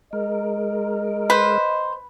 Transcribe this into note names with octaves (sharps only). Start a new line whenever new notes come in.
G#3 A#4 D#5
B4 C5